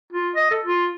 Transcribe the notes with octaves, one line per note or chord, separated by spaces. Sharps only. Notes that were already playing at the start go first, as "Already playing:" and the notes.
F4
D#5
A4
F4